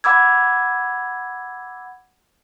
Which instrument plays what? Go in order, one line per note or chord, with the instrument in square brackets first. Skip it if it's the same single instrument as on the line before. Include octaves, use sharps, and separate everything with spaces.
[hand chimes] F#5 B5 D6 E6 G#6